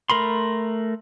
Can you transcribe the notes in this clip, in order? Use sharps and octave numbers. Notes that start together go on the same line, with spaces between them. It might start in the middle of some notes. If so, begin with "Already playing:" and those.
A3 A#4 B5 C6